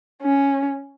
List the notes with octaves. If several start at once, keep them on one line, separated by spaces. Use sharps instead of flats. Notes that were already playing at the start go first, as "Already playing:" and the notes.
C#4